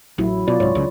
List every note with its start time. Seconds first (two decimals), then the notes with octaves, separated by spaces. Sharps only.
0.18 A1 F#3 E4
0.48 B2 F4 D5
0.60 C2 G#2 C#5
0.75 C#2 C#3